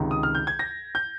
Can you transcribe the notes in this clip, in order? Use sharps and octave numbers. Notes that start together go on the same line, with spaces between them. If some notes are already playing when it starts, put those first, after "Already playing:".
Already playing: C#2 C3 D#3
D#6
F6
G6
G#6
A#6
G6